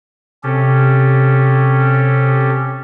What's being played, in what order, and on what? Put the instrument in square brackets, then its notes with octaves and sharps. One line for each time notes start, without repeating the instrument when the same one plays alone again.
[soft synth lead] C3 [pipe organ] C#4 G4 A4